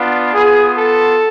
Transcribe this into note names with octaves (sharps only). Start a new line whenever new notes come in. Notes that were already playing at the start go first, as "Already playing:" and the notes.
Already playing: B3 D4 F4
B3 F4 G#4
A4